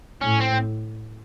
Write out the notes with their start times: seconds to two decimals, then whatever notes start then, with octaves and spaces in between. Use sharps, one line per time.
0.21 A2 C#4
0.41 C4